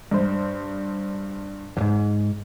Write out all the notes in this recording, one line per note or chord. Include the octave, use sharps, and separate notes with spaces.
G2 C5
E2 G#2